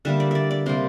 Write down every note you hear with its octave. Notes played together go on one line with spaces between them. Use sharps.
D3 G3 A#3 E5
D5
D5 E5
D5
C3 G3 A#3 C5